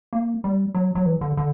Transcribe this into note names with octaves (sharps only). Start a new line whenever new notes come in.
A#3
G3
F#3
F#3
E3
D3
D3